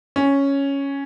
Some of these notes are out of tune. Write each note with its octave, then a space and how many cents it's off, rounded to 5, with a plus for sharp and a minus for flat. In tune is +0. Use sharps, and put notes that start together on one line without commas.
C#4 +0